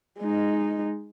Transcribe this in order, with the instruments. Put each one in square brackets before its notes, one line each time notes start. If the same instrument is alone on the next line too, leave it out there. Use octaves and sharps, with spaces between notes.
[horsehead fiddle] G#3 D#4